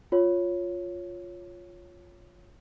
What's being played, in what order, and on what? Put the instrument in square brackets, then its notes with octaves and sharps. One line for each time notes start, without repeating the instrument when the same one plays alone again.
[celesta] F4 C#5